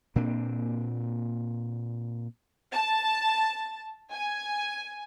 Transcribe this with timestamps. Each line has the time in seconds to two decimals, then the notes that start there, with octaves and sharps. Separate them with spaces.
0.16 A#2 A#3 C4 D4
2.73 A5
4.12 G#5